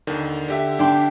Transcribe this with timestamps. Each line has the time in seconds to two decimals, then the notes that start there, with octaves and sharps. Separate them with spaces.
0.07 D#2 D3 D#3
0.48 D3 G4 E5
0.79 D4 G5 C6